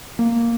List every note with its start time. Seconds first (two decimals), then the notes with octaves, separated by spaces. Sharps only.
0.19 A#3